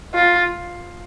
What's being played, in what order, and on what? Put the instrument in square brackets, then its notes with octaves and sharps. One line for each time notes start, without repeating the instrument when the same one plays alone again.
[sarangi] F4